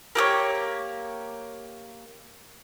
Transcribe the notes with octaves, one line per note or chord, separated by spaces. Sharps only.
A#3 G4 A4 C#5